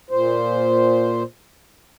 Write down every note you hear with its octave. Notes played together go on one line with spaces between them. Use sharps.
A#2 C5